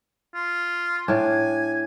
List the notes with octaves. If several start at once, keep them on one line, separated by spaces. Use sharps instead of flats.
F4
A2 D4 G#5